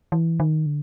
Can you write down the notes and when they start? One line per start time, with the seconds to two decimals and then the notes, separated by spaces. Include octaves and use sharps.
0.12 E3
0.40 D#3
0.66 D3